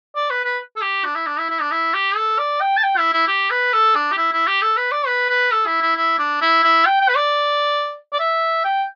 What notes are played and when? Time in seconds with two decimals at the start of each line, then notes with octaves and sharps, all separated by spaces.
0.16 D5
0.30 B4
0.45 B4
0.76 A4
0.82 G4
1.05 D4
1.16 E4
1.27 D4
1.38 E4
1.50 E4
1.61 D4
1.72 E4
1.94 G4
2.16 A4
2.39 D5
2.61 G5
2.78 A5
2.83 G5
2.98 E4
3.13 E4
3.28 G4
3.50 B4
3.73 A4
3.95 D4
4.12 G4
4.18 E4
4.32 E4
4.47 G4
4.62 A4
4.77 B4
4.92 D5
5.07 B4
5.29 B4
5.52 A4
5.66 E4
5.82 E4
5.96 E4
6.19 D4
6.41 E4
6.63 E4
6.86 G5
7.01 G5
7.09 B4
7.15 D5
8.13 D5
8.20 E5
8.64 G5